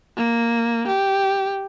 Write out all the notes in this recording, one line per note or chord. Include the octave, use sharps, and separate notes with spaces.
A#3
G4